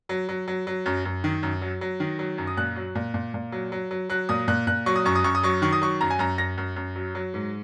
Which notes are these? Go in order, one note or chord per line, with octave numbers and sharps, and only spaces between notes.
F#3
F#3
F#3
F#3
F#2
F#2
D#3
F#2
F#3
F#3
D#3
F#3
F#2
D#6
A#2 F#6
F#3
A#2
A#2
A#2
F#3
F#3
F#3
F#3 F#6
A#2 D#6
A#2 F#6
A#2 F#6
F#3 C#6
D#6
F#2 C#6
D#6
F#2 C#6
D#6
F#3 C#6
D#3 C#6
D#6
F#3 C#6
F#2 A#5
G#5
F#2 A#5
F#2 A#6
F#2
F#2
F#3
F#3
G#2